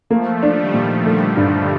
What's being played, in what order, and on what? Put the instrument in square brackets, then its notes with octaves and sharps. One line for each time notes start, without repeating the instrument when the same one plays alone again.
[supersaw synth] F3 A3 [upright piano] A#3
[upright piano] D4
[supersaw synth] D#3 G3
[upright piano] A#2
[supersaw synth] D3 F3 [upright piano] A3
[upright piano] G2